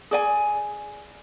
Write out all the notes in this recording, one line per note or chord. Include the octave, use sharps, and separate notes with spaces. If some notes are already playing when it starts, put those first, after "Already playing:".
G#4 D5 G#5